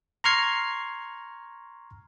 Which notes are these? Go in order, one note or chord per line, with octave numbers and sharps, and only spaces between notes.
A#5 C6 C#6 F6 G#6 C7